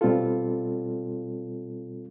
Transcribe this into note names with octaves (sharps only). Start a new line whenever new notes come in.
B2 G3 C4 F4 A4